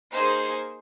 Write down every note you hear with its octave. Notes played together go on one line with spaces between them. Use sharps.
A#3 D#4 G#4 C5